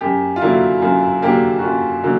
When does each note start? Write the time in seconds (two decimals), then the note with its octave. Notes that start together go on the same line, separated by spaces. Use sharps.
0.01 F#2 G4
0.36 F4
0.41 D3 F#3 A#3 E4
0.82 F#2 F4
1.22 D3 F#3 A#3 G4
1.59 F#4
1.63 F#2 F4
2.03 D3 F#3 A#3